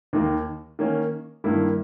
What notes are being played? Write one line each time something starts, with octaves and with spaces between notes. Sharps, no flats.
D#2 D#3 A#3
D#3 A#3 C#4
G2 D#3 A#3 E4